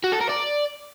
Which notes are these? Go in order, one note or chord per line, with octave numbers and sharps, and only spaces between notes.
F#4
A4
A#4
D5